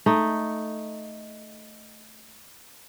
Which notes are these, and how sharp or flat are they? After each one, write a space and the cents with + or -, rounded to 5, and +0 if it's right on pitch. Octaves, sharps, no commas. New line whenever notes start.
A3 +0 D#4 +0